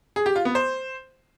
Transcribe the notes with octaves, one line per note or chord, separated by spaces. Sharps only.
G#4
G4
F4
B3
C5